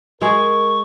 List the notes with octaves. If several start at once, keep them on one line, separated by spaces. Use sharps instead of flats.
G#3 G#4 A#4 C#6